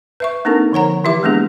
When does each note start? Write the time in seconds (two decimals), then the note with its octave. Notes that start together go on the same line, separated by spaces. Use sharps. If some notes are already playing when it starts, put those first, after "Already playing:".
0.20 B4 E5 C#6
0.45 A#3 C4 D4 D#4 A4 A#4
0.72 D3 F3 C#5 F#5 A#5
1.04 E3 E4 G4 E5 D6
1.23 G#3 A#3 B3 D4 G#4